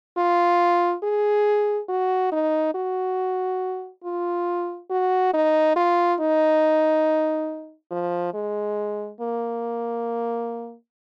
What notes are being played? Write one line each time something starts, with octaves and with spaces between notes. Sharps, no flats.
F4
G#4
F#4
D#4
F#4
F4
F#4
D#4
F4
D#4
F3
G#3
A#3